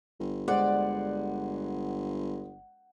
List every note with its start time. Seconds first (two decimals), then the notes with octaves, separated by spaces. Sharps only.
0.20 G1
0.48 G#3 C5 D5 F#5